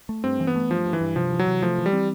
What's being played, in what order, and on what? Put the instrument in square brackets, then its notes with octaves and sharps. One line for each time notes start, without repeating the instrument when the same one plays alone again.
[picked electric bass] A3
[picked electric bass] G2 [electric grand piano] C4
[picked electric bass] E3
[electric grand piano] B3
[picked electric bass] A3
[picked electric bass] G2 [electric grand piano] F3
[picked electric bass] G2
[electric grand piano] E3
[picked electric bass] G2
[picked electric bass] C3 [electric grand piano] F3
[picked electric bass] E3
[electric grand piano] F#3
[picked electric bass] C3
[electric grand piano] F3 [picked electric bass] A3
[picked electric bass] E3
[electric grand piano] G3
[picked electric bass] C4